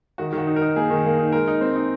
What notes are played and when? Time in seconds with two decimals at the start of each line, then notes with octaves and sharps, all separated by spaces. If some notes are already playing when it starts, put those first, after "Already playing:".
0.18 D#3 F#4
0.33 D#3
0.38 F#4
0.47 D#4
0.56 A#4
0.62 D#4
0.76 A#3 G#4
0.90 D#3
1.05 A#3
1.18 D#4
1.32 G#3 A#4
1.48 D#4
1.61 C4
1.76 D#4